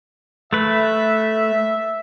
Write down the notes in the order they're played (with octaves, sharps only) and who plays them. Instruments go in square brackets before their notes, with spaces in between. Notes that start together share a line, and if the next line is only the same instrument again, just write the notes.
[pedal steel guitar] A3 B4 [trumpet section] E5